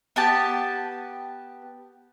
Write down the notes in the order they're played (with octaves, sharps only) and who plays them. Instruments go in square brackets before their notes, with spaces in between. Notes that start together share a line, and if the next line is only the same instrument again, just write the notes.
[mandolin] B3 G4 A5